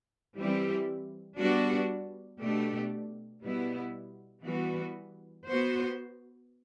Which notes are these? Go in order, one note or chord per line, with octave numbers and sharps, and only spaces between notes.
E3 G3 C4 E4 G4
G3 B3 D4 F#4
B2 A3 D4 G4
B2 G3 B3 E4
E3 G3 B3 F#4
B3 F#4 C5